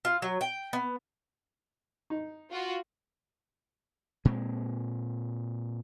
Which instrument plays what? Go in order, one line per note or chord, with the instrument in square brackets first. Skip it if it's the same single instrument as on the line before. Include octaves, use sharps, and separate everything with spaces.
[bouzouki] F4
F#3
G5
B3
[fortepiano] D#4
[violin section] F4 F#4
[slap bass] A#2 G#3 C4